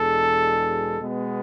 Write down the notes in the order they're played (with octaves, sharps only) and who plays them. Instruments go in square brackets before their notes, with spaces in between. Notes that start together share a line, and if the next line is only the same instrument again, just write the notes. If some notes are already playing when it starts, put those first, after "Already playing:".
Already playing: [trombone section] E2 B2 G#3 D4 G#4 [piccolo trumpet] A4
[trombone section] B2 G#3 B3